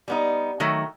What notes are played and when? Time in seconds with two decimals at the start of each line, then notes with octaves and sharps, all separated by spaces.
0.08 G3 B3 D#4
0.60 D#3 F#3 A3